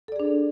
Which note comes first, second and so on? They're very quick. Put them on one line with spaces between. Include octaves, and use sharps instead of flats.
A4 D5 G#4 D4